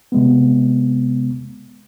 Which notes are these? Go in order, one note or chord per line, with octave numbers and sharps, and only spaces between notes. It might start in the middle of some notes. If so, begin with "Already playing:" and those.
C3 G#3 B3